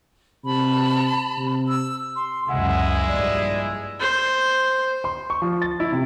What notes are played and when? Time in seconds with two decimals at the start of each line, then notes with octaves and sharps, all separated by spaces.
0.45 C3 A5 B5
1.38 C3
1.68 E6
2.16 C6
2.49 C#2 F#2 C#3 G#3 E4 G#4 F#5
3.08 A#1 G2 D5
4.00 C5
5.04 C6
5.30 C#6
5.42 F3
5.62 A6
5.80 E4
5.92 C3